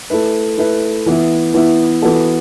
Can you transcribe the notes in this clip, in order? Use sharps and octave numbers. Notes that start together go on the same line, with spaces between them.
A3 E4 B4
A3 E4 B4
E3 B3 E4
E3 B3 E4
E3 B3 F#4 A4